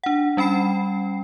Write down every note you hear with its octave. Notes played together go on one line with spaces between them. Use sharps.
D4 F#5
G3 C#4 G5 B5 C7